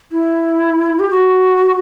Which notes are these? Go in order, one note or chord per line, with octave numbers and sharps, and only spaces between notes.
E4
G4
F#4